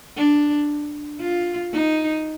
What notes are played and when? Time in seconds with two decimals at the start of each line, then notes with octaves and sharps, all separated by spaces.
0.17 D4
1.21 F4
1.73 D#4